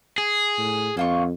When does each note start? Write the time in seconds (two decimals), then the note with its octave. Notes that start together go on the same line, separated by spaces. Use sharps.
0.18 G#4
0.58 A2
0.97 F2 A#3 F4 C#6